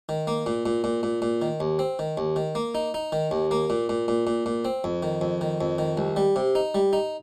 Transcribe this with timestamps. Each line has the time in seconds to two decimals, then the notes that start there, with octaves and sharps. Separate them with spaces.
0.09 D#3
0.27 A#3
0.46 A#2
0.66 A#2
0.84 A#2
1.03 A#2
1.22 A#2
1.42 D#3
1.60 D#2
1.79 C4
1.99 D#3
2.17 D#2
2.36 D#3
2.55 A#3
2.75 D#4
2.94 D#4
3.12 D#3
3.31 D#2
3.51 A#3
3.70 A#2
3.89 A#2
4.08 A#2
4.27 A#2
4.46 A#2
4.65 C4
4.84 F2
5.03 D#3
5.21 F2
5.41 D#3
5.61 F2
5.78 D#3
5.97 C2
6.16 G3
6.36 C3
6.55 D#4
6.75 G3
6.93 D#4